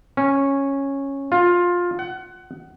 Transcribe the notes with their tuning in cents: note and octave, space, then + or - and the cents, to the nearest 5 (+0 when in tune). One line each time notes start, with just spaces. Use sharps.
C#4 -10
F4 +15
F#5 +20